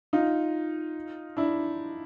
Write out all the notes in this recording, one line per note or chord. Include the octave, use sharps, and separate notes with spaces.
D#4 F4
D4 E4